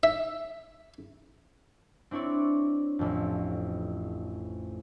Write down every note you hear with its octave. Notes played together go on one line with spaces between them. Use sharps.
E5
C4 D4 E4 C#5 D5
A1 F2